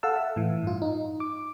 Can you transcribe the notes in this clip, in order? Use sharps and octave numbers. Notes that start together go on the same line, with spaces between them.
A4 F5 F#5 A5 E6
E5
A2 E3
G2 F4
D#4
D6